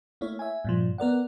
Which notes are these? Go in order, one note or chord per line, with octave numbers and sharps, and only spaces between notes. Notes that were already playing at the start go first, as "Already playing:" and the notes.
A3 A#3 E4 C#5
E5 G#5
G2 A#2 F3
B3 A#4 D5 F#5